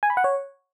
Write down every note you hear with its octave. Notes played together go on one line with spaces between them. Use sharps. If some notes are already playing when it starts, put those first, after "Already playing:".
G#5
B5
F#5
C#5